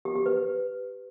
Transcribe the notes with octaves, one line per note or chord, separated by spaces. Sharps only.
G4
G4
B4